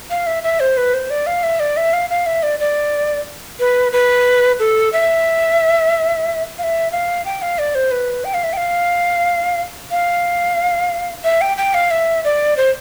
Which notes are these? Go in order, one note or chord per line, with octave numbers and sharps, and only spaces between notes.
F5
E5
E5
C5
B4
C5
D5
F5
E5
D5
E5
F5
F5
E5
D5
D5
B4
B4
A4
E5
F5
E5
F5
G5
F5
D5
C5
B4
G5
F5
E5
G5
F5
F5
E5
G5
G5
F5
E5
D5
C5